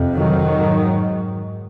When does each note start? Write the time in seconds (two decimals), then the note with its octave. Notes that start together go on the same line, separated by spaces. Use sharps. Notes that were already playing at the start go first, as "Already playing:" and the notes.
Already playing: F2 C3
0.13 D#3 F#3
0.49 G#2